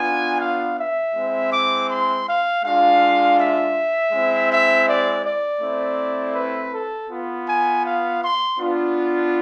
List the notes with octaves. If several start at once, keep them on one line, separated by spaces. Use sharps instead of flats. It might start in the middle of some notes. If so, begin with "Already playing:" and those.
Already playing: B3 D4 F4 G#5
F5
E5
G#3 C4 E4
D6
C6
F5
G#3 D4 F4 F5
E5
G#3 C4 E4
E5
D5
D5
A3 C4 E4
B4
A4
B3 F4
G#5
F5
C6
B3 D4 F4